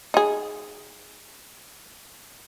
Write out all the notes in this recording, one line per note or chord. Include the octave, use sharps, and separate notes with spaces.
D#4 G#4